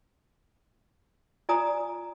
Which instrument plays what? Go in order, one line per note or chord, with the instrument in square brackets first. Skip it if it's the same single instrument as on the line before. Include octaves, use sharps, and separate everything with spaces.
[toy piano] F4 D5 G#5 A#5 D#6